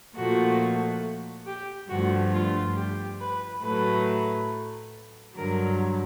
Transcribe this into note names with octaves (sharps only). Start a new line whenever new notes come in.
A#2 F3 A3 F#4
G4
G2 D3 F3 A3 F#4
F4
G4
B4
A2 F#3 A3 B4
G2 D3 F#3 A#4